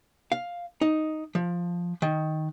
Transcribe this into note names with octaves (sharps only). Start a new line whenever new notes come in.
F5
D#4
F3
D#3